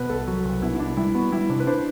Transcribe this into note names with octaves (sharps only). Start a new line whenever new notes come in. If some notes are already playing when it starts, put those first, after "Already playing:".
Already playing: B2 B4
C2 A4
F#3
C2
B2 E4
E4
C2 D4
G3 E4
B3 F#4
G3 E4
C3 D4
B4
D4 C5